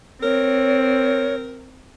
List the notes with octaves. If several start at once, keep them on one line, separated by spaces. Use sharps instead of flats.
C4 A#4 C#5